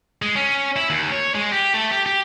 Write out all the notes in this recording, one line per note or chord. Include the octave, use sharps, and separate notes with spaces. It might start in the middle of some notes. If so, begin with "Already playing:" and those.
G#3
C#4
E4
D#2
C#5
G#3
G4
A3
G4
G4